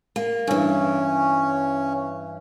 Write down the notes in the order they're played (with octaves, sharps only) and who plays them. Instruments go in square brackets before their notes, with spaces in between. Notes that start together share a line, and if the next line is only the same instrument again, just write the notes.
[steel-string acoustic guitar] A#3
[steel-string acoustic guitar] G2 E3 [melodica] C#4